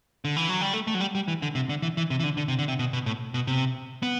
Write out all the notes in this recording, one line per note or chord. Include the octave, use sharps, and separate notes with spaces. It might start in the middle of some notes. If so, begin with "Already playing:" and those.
D3
E3
F#3
G3
A3
A3
F#3
G3
G3
E3
D3
C3
D3
E3
E3
C3
E3
D3
D3
C3
D3
C3
B2
B2
A2
B2
C3
B3